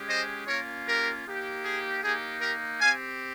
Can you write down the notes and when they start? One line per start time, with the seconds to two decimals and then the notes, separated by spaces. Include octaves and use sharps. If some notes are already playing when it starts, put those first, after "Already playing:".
Already playing: G#3 C#4 G4
0.09 C5 D#5
0.47 A#3 C#4 F4 A#4 C#5
0.86 G4 A#4
1.25 A#3 D#4 G4
1.64 G#4
2.03 A#3 D#4 G4 G#4
2.41 G4 A#4
2.80 C4 G4 F5 G#5